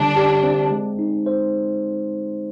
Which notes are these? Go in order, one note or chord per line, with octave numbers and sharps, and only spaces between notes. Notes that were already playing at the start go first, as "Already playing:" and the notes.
Already playing: D3 G3 D4
G4
C4
G#3
D#4
C5